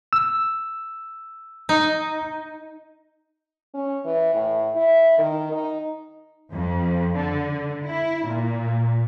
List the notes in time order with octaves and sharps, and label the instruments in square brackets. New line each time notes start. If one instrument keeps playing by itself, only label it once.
[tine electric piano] E6
[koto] D#4
[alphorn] C#4
E3
A2
E4
D#3
D#4
[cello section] F2
D3
E4
A#2